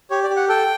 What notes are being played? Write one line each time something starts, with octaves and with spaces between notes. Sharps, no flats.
G4 C#5
D5
G4
F#5
A4 G5